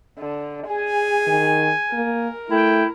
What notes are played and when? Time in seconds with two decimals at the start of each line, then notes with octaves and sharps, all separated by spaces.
0.19 D3
0.67 G#4 G#5
1.27 D#3
1.93 A#3 A#4
2.51 A3 E4 G5